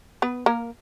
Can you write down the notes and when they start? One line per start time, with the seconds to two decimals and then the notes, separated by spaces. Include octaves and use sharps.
0.22 B3 B4
0.46 A#3 A#4